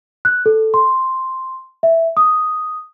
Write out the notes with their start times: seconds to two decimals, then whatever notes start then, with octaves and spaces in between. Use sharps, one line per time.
0.25 F#6
0.46 A4
0.74 C6
1.83 E5
2.17 D#6